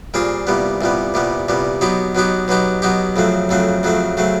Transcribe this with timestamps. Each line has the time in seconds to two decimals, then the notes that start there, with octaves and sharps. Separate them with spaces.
0.14 A#2 G3 C4 F4 G#4
0.47 C2 A#2 G3 B3
0.81 C2 A#2 G3 B3
1.14 C2 A#2 G3 B3
1.48 C2 A#2 G3 B3
1.81 B2 F#3 B3 D#4 G4
2.15 B2 F#3 B3 D#4 G4
2.48 B2 F#3 B3 D#4 G4
2.82 B2 F#3 B3 D#4 G4
3.16 F2 C#3 F#3 A3 C4
3.49 F2 C#3 F#3 A3 C4
3.83 F2 C#3 F#3 A3 C4
4.17 C#3 F#3 A3 C4